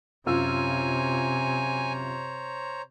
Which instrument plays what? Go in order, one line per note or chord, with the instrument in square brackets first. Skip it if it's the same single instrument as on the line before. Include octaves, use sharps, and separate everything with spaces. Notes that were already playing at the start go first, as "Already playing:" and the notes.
[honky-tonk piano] F#2 F4 E6 [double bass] C3 [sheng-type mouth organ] C5 C#5 A#5 [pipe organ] G#5